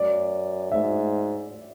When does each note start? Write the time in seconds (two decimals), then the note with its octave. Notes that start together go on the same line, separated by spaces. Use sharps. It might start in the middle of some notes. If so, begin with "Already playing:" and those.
Already playing: F#2 D5
0.71 G#2 E5